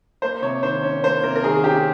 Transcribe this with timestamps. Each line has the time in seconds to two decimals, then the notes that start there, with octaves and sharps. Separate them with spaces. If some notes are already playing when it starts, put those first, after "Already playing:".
0.22 A#3 C5
0.42 C3 C#5
0.63 D#3 C5
0.83 C#4 C#5
1.04 A#3 C5
1.23 C3 A#4
1.36 A#4
1.44 D#3 G#4
1.64 C#4 G4